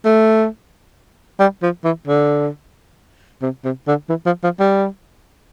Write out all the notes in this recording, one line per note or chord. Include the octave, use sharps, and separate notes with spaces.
A3
G3
F3
E3
D3
C3
C3
D3
E3
F3
F3
G3